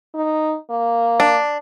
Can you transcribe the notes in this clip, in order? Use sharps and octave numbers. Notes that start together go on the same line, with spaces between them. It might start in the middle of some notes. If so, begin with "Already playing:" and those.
D#4
A#3
D4